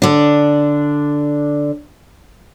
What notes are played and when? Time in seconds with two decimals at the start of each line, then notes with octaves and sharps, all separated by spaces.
0.02 D3 D4